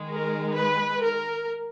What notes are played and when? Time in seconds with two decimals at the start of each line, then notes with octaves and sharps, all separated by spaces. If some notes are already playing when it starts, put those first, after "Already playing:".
Already playing: D#3 G#3
0.11 A#4
0.56 B4
1.01 A#4